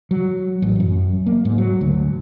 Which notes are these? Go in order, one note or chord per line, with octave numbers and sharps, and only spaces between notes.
F#3
A1
F#2
A#3
G#2
F#3
D2